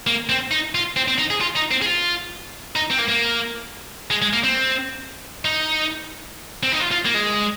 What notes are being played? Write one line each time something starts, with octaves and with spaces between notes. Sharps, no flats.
A#3
C4
D#4
F4
C4
C4
D#4
G#4
F4
D#4
C4
G#4
F4
D#4
C4
A#3
A#3
G#3
G#3
A#3
C4
D#4
C4
D#4
F4
F4
A#3
G#3